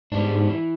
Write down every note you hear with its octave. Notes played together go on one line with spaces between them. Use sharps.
G#2 G3 B3 D4
E3